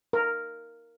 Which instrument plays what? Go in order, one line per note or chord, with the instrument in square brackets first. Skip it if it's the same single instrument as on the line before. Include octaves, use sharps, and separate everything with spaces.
[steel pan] A#4